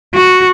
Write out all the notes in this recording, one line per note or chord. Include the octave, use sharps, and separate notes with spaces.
F#4